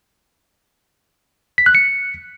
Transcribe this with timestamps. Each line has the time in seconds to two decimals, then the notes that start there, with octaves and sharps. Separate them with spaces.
1.58 B6
1.66 F#6
1.75 C#7